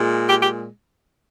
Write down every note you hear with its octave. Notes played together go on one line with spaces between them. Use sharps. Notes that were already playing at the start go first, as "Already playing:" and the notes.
Already playing: A#2 G#3
G4
G4